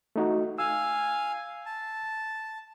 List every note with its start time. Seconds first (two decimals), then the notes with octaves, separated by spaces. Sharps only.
0.16 A3 D#4 F#4
0.58 F5 G#5 E6
1.66 A5